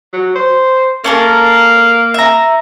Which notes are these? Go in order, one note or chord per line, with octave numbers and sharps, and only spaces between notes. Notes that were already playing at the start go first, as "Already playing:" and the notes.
F#3
C5
A#3 C#4 A4 A#4
E5 A#5